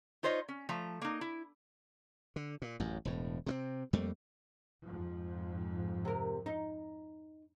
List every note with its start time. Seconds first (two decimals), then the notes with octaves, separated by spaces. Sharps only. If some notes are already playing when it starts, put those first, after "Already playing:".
0.23 D#4 F4 C5 C#5 D#5
0.48 C#4
0.69 F3 A3 A#5
1.01 A#3 D#4
1.21 E4
2.36 D3
2.62 A#2
2.80 A1 F#2
3.05 E1 A2
3.46 C3 G3 C4
3.93 F2 G3 A3 A#3
4.85 F2 G#2 F3
6.05 C3 A#4
6.46 D#4